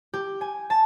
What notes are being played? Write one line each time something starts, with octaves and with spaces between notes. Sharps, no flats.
G4
G#5
A5